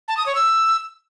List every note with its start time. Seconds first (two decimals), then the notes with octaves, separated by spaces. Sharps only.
0.08 A5
0.17 D#6
0.26 C#5
0.35 E6